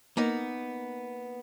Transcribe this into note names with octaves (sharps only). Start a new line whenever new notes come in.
A#3 B3 D#4